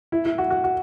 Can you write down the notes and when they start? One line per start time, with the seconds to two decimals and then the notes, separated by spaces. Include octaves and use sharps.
0.12 E4
0.25 E4
0.38 F#4
0.50 F#4
0.64 F#4